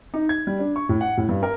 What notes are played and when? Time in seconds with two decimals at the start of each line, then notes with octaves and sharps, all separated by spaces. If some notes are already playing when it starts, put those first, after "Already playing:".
0.14 D#4
0.29 G#6
0.47 G3
0.59 D4
0.76 C#6
0.89 A2
1.01 F#5
1.17 A2
1.29 G2
1.43 A#4